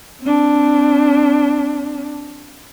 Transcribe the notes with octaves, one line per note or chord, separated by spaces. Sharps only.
C4 D4